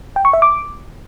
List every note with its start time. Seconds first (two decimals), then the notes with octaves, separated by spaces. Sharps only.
0.16 G5
0.25 C#6
0.33 E5
0.42 D6